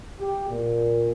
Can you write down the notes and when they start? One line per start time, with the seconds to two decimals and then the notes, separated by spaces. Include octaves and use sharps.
0.18 G4
0.49 A#2